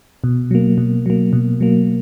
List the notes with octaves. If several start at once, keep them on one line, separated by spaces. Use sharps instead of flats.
B2
F#3 A#3
B2
F#3 A#3
B2
F#3 A#3